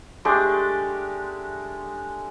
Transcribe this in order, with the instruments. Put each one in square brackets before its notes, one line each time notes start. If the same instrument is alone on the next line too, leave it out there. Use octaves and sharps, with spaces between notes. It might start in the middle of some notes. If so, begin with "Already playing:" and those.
[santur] G#3 A3 D4 G4